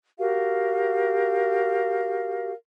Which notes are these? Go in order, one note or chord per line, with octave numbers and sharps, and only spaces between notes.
F#4 G4 A#4 F5